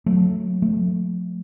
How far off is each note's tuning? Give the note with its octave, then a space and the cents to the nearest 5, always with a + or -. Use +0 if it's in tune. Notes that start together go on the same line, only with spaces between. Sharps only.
F#3 -10 A3 +0
F3 +45 A3 +0